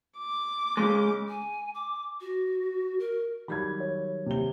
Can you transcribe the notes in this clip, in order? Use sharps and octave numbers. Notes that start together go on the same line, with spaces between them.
D6
C#3 G#3
G#5
D6
F#4
A#4
D#3 F#3 G3 B5 G#6
C#5
C3 G7